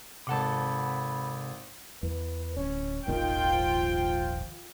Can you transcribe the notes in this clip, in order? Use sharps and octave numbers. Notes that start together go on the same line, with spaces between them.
G#1 C3 A4 F#5 A5 B5 D6
E2 B4
D1 C#4
D#1 G#1 D#2 D#3 F4 G5
F3